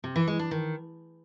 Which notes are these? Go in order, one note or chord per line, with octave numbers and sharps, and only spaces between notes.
C3
E3
G#3
D4
D#3